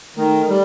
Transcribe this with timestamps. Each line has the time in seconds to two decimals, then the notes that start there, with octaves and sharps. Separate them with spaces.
0.17 D#3 A3
0.48 G3